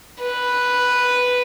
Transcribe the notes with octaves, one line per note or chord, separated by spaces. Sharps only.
B4